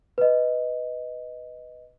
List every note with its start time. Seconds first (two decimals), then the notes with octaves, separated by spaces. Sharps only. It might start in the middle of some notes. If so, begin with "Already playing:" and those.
0.18 B4 D#5